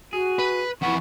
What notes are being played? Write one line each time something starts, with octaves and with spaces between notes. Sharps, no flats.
F#4 G#4
B4
F2 E3 B3 F#5 C#6